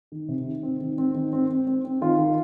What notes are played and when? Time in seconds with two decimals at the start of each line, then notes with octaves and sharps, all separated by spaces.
0.12 D#3
0.28 C3
0.46 D#3
0.63 C4
0.81 D#3
0.98 C4
1.14 D#3
1.33 C4
1.49 C4
1.67 C4
1.85 C4
2.01 D#3 F4
2.18 D#3